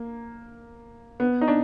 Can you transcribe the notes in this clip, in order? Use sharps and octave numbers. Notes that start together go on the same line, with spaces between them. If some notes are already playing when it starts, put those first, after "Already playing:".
Already playing: A#3
B3
D#4
D4